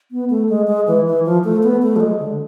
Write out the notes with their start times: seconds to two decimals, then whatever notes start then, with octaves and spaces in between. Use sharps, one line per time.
0.11 B3
0.30 A3
0.49 G#3
0.67 G#3
0.87 E3
1.06 E3
1.25 F3
1.44 A3
1.63 B3
1.82 A3
1.96 F3
2.00 G#3
2.20 D3